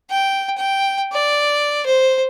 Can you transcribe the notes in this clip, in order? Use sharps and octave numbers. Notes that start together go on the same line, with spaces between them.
G5
G5
D5
C5